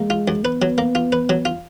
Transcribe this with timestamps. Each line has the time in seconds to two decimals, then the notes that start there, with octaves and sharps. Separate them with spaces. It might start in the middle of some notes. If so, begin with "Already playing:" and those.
Already playing: G#3 A#3
0.10 F4
0.28 F#2
0.44 B3 B4
0.62 F#3
0.78 A#3
0.95 F4
1.12 B4
1.29 F#3
1.45 F4